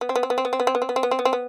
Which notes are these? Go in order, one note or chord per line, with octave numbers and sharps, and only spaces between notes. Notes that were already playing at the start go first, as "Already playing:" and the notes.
B3
C4
B3
C4
B3
C4
B3
C4
B3
C4
B3
C4
B3
C4
B3
C4
B3
C4
B3